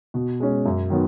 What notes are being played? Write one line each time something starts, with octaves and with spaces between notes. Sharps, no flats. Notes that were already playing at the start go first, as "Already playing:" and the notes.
B2
G#3 C#4
F#2
D#3 F#3 B3